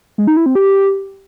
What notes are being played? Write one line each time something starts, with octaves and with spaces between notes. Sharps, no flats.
G#3
D#4
E4
C4
G4